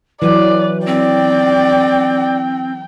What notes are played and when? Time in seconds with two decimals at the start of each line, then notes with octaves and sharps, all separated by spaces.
0.22 E3 F#3 B4 D5
0.86 C4 D5 G5